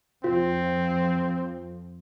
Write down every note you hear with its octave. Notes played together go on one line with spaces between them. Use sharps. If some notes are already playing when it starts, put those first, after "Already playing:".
F2 F3 C4 F4